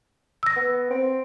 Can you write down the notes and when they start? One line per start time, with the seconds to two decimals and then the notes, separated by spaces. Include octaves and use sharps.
0.43 E6 A#6
0.56 B3
0.90 C4